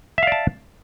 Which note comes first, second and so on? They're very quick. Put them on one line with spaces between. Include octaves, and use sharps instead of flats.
E5 F5 D5 A5